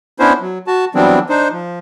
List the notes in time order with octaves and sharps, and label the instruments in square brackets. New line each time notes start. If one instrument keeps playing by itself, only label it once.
[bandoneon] B3 C#4 D4 E4 C5
F#3
F#4 A5
E3 F#3 G3 B3 C4 D4
D4 D#4 C5
F3